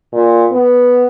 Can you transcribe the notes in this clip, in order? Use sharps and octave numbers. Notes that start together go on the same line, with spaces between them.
A#2
B3